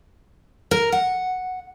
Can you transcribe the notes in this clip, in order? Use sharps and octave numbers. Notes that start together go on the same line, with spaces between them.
A#4
F#5